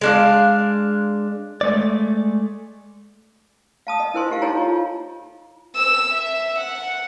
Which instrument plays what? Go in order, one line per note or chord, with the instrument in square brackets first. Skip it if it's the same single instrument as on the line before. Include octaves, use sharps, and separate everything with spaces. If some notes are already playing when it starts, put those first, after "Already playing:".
[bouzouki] G#3 D4 F5
[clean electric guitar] G#3 A3 D5
[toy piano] F5 A5 D#6
D#5
D4 E4 A#4 C5 G#5 C6
E4 G4 F5
D#4 A4 C#5 G#5 A#5
F4
[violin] E6
E5
F#5